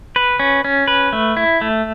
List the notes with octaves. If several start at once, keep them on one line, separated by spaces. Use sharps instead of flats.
B4
C#4
C#4
B4
A3
E4
A3